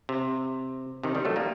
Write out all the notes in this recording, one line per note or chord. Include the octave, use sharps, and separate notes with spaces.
C3
C3 D#3
D#3 G3
F#3 A3
G3 A#3